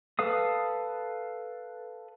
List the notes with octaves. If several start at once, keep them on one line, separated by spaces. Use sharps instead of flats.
A4 B4 F5 D#6